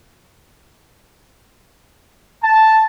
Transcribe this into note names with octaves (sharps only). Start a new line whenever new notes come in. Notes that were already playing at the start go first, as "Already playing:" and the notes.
A5